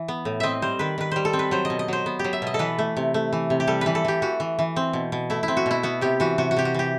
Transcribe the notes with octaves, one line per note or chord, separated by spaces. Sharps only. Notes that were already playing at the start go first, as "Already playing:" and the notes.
Already playing: E3
B3
A2
C4 D#5 E5
G3 C5
D#3 B4
D#3 B4
G3 C5
A4
C4
B4
F#3 C5
D#5
B2
D#5
F#3 C5
B3
G4
F#3
E5
B2 D#5
A4
E3 B4
A3
C3
A3
E3
C3
G4
G3 A4
E3 B4
A4
E3 G4
E3 F#4
E3
E3
C4
B2
B2
A3 E4
E4
C4
F#4
B2 E4
B3 F#4
C3 G4
E3 F#4
C3 F#4
F#4
C3 G4
F#4
E3 G4